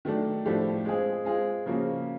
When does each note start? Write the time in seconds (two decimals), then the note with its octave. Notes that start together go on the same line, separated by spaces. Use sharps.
0.05 D#3 F#3 A3 D4
0.45 A2 F3 A3 D4 G4
0.85 G#3 C4 F4 G#4
1.25 G#3 C4 F4 G#4
1.66 C#3 F3 A#3 C#4 F#4